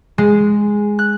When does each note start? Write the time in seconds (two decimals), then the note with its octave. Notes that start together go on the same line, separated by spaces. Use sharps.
0.18 G#3
0.99 F#6